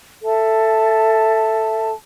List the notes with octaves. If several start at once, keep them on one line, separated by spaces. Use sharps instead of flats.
A4 E5 A5